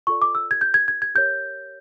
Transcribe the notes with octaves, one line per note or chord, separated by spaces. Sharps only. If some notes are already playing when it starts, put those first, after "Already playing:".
F4 A4 D5 C#6
D6
E6
G#6
G6
G#6
G#6
G#6
G4 A#4 C#5 G6